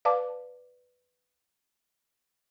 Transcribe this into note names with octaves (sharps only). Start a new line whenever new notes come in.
B4 D5 F5 A5 D6